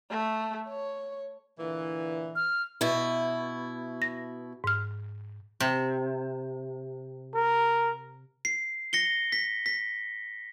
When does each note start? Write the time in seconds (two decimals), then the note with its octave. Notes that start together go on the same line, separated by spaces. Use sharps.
0.11 A3
0.69 C#5
1.58 A#2 D3 E3
2.36 F6
2.81 B2 E4
4.02 A#6
4.64 G#2 F6
5.60 C3
7.35 A#4
8.45 C7
8.93 A#6 C#7 G7
9.32 B6
9.66 B6